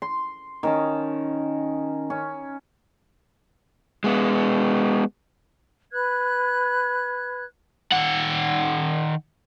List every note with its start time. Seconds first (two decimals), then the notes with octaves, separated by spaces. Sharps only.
0.02 C6
0.63 D#3 C#4 A5
2.10 C#4
4.04 G#3 B3
5.92 B4 F#6 G#6
7.92 D#3 F#5